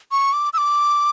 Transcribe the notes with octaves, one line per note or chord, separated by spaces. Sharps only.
C#6
D6
E6
D6